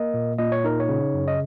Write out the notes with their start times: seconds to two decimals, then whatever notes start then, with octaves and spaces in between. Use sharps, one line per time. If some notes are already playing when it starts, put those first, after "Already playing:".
Already playing: A#3 A#4 D#5
0.14 A#2
0.39 A#2 D#5
0.52 C#5
0.64 D#4 A#4
0.80 C#5
0.89 C#3
1.14 F#2
1.28 D#5